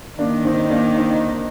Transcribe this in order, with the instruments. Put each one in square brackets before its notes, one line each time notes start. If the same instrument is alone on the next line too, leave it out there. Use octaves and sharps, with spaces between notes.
[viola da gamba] D#3 [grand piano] A#3 D4
[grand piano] C4 D#4
A#3 D4
C4 D#4